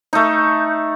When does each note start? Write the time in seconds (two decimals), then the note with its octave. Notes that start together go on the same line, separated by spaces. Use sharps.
0.13 A3 D#4